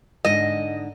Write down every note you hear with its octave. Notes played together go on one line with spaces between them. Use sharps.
G#2 D3 D#5